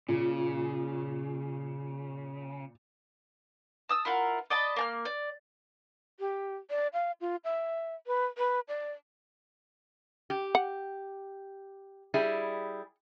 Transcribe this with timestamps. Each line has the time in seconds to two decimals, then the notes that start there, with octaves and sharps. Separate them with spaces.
0.09 A#2 C#3
3.89 A5 D#6 E6
4.05 E4 F4 A#4 F#5
4.50 D5 D#5 A5 B5
4.76 A#3 A5 F6
5.05 D5
6.20 G4
6.70 D5
6.93 F5
7.21 F4
7.44 E5
8.07 B4
8.38 B4
8.68 D5
10.30 G4
10.55 F#5
12.14 G3 E4 G#4